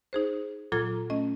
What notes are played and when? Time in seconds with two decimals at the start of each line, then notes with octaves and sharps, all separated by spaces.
0.13 D#4 G#4 C5
0.72 A#2 F#3 F4 A4 A#5 G#6
1.10 A3 C#4 D#5